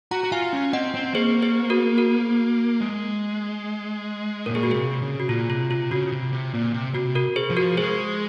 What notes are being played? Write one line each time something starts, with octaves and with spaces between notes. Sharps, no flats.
F#4 F#5 A#5
F#4
F4 F5 G#5
C#4
C4 D#5 F#5
C4
A#3 G#4 C5
G#4 C5
F#4 A#4
F#4 A#4
G#3
A#2 A#4
G#4
F#4
C3 G#4
C#3
F#4
A#2 F4
C3 F4
C3 F4
C#3 F#4
C3
C3
A#2
C3
C3 F#4
F#4 A#4
G#4 C5
F3
F#4 A#4
G#3 G#4 C5